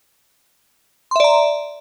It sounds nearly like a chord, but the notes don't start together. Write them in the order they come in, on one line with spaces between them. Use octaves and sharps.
C6 E5 D5 A#5